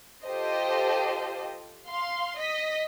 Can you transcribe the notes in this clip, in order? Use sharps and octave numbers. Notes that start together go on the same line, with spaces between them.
F4 G4 A4 C5 D#5
F5 C6
D#5 B6